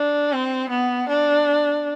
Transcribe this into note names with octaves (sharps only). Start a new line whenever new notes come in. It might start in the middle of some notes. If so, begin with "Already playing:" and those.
Already playing: D4
C4
B3
D4